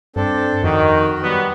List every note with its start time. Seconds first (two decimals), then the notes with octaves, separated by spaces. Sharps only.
0.16 G2 C4 D4 A4
0.63 F2 D#3 F#4
1.22 F#3 G3 B3